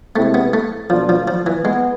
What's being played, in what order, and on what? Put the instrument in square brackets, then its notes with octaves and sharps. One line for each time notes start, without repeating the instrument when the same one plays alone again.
[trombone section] C3 G#3 C4 E4 [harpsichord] A3
[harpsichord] B3
A3
[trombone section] B2 A3 D4 F4 [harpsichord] F3
[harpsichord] F3
F3
E3
[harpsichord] G#3 [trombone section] B3